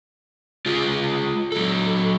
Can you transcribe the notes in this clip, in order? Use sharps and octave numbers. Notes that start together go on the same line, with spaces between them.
G#3 F4 G#4
F#3 A4